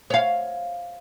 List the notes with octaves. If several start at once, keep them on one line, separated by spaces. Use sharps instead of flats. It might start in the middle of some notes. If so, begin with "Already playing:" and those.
C#5 F5